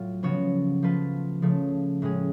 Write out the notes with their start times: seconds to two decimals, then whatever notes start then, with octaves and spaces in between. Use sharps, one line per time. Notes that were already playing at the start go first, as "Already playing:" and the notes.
Already playing: A2 F#3 F4
0.23 C#3 F3 B3 F#4 C#5
0.82 F3 A3 F4 B4
1.42 C#3 F3 A3
2.02 A2 G#3 C#4 G#4